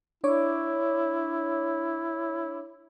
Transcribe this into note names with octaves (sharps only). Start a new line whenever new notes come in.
D4 E4 C#5 D6